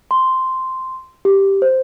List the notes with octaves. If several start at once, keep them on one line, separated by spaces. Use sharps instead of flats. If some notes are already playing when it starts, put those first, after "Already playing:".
C6
G4
C5